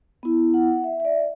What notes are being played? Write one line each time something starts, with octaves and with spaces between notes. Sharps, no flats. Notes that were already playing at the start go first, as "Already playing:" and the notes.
B3 E4
F#5
E5
E5
D5